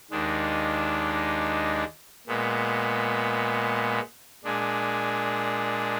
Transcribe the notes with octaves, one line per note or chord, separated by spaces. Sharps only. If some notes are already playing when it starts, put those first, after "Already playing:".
D#2 D#3 G#3 D4
A#2 G#3 B3
A#2 G#3 D4 G#4